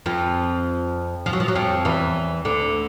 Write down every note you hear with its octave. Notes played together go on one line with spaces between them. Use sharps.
F2 F3
F3
F#3
F3
F#3
F2 F3
E2 E3
D2 D3